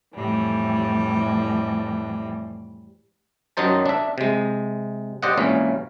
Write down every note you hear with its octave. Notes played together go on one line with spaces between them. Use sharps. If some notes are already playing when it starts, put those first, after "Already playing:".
F2 A2 E3 G3
F#2 D#3 F#3 D#4 C5 A5
D4 E5
C3 G#3
G4 C5 D5 D#5 F#5
G#1 A#2 E3 A#3 C#4